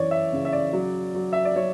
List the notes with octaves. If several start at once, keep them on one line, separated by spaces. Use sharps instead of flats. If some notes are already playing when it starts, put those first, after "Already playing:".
Already playing: F#2 E3 C#5 D5
E5
C#3
E5
D5
F#3
F#3
E5
D5
F#3 C#5